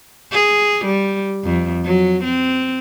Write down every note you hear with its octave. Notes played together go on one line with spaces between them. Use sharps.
G#4
G3
F2
F#3
C4